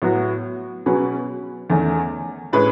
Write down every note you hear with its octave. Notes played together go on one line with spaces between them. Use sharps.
A2 F#3 B3 F#4
B2 F#3 C#4 G#4 B4
E2 D#3 A3 C#4
A2 G#3 C#4 E4 B4